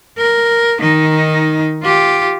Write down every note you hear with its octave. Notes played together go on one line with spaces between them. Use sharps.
A#4
D#3 D#4
F4 G4